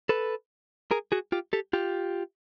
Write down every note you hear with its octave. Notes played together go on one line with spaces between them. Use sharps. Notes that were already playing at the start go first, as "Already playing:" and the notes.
A4 B4
G#4 A#4
F#4 G#4
F4 G4
G4 A4
F4 G4